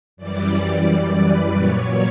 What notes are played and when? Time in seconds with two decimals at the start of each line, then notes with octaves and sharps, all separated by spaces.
0.17 F#2 E3 G3 D5
1.20 B4
1.54 A#2 F#3 C#5